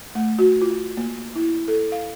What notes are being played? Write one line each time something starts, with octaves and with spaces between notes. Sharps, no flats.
A3
F#4
F4
A#3
E4
A4
F5